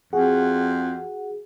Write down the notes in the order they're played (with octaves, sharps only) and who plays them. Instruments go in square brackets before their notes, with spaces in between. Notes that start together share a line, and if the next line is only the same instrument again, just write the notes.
[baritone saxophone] F2 [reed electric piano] F#4 F#5 [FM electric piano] G#4